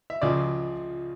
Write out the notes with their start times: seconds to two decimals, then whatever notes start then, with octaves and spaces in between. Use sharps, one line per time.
0.10 E5
0.22 C#2 C#3 F3 D5